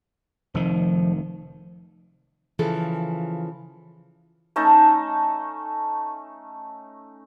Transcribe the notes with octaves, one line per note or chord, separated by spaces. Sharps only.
F1 D#3 F3
C#3 E3 F3 G#4 A4
A3 C#4 D#4 A5